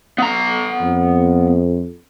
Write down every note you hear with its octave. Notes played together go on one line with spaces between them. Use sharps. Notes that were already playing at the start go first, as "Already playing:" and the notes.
B3 A#5
F2